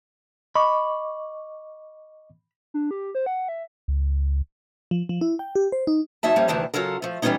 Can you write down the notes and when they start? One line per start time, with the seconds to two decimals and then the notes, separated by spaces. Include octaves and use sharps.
0.56 D#5 B5 C#6 D6
2.74 D4
2.91 G4
3.15 C5
3.26 F#5
3.49 E5
3.88 C#2
4.91 F3
5.09 F3
5.21 E4
5.39 G5
5.55 G4
5.72 C5
5.87 D#4
6.23 E2 F#3 D#4 E5 A5
6.36 F2 G3 A#3 C#4
6.48 D2 C3 D#3 E3 G3 A5
6.74 C#3 F#3 F4 A4 A#4
7.02 F3 A3
7.22 E3 G3 A3 B3 C#4 D#4